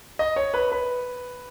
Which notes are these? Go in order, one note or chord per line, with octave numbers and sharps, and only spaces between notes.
D#5
C#5
B4
B4